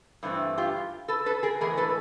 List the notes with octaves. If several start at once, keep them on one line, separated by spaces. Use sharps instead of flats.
G2 E3 A3 C4
F4 G4
A4 B4
A4 B4
G#4 A#4
A2 E3 G#3 B3 G#4 A#4
A4 B4